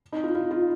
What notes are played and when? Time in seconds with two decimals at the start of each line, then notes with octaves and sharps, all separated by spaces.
0.12 D#4
0.24 F4
0.35 F4
0.51 F4